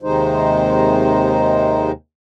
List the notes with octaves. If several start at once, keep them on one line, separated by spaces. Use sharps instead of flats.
D#2 C3 D#3 G#3 D#4 C5